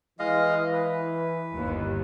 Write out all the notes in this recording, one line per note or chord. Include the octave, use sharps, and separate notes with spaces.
E3 G#3 D#5 F5
B4
G1 D#2